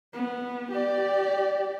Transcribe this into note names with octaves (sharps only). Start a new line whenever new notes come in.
B3
G4 D5